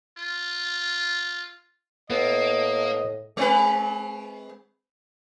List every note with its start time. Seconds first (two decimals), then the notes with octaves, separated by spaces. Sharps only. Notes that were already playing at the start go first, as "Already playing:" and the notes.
0.18 F4
2.10 A2 A#3 B3 D#5 E5
3.37 G#3 C4 B4